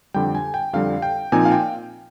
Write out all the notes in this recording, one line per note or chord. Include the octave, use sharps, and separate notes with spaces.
F2 D3 G3 G5
G#5
G5
F2 D3 G3 F5
G5
A#2 F3 C4 D#4 G#5
F5
G5